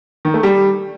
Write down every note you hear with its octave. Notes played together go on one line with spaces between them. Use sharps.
D#3
A3
G3